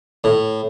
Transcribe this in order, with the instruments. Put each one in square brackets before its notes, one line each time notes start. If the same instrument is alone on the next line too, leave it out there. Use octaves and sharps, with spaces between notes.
[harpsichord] A2